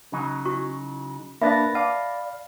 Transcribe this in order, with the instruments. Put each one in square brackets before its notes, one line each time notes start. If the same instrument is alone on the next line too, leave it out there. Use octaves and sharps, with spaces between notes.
[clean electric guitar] C#3 F#3 D#4
[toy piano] E4 F#4 C#6
[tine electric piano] A#3 D4 B4 [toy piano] E5 [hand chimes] B5 A6 A#6
[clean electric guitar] D5 [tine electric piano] F5 [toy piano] A5